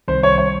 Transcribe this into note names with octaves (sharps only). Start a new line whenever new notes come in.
C2 C3 D#3 G3 C5
C#5
C#5